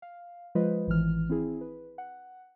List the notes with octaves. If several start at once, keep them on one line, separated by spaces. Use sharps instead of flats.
F5
F3 G#3 F4 B4 C5 D#5
A1 D#3 E3 F6
C4 E4 G#4
B4
F#5